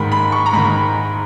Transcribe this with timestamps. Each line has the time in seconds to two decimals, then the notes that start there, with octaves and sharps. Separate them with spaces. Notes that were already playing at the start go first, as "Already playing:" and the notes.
Already playing: G#2 D#3 B5
0.12 B5
0.32 C#6
0.46 A#5
0.53 G#2 D#3 B5